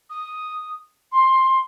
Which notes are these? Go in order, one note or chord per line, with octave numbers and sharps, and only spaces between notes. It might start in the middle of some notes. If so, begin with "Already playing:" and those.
D#6
C6